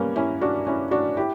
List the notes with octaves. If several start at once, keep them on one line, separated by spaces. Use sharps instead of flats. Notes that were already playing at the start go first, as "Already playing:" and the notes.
Already playing: G3 A#3 B3 C#4
C#4 E4
D4 F#4
C#4 E4
D4 F#4
E4 G4